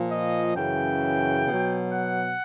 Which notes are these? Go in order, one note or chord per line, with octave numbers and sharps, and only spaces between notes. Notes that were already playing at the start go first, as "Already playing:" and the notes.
Already playing: A#2 F3
D#5
F#2 C#3 E3 G5
B2 F#3
F#5